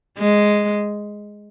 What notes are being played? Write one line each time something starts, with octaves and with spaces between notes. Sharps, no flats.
G#3